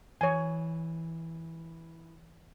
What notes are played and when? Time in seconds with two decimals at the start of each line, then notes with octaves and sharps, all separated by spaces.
0.21 E3 C#5 G#5